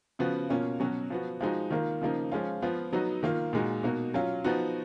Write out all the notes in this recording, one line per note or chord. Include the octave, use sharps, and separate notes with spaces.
C#3 F3 B3 F#4
B2 A#3 C#4 F4
B2 F#3 C#4 F#4
F3 B3 F#4
F3 G#3 D#4 F#4
D#3 A#3 F4
C#3 F3 A#3 D#4
F3 G#3 C#4 F4
F3 B3 F4
F#3 B3 D#4 F#4
D#3 A#3 F4
A#2 G#3 D#4 F#4
B2 A#3 D#4 F#4
F#3 C#4 F4
F3 B3 D#4 F#4